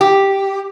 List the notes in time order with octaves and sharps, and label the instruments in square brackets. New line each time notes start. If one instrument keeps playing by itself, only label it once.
[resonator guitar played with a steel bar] G4